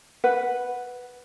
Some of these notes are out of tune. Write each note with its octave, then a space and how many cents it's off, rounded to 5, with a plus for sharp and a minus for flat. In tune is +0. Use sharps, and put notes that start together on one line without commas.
B4 +0 F#5 -5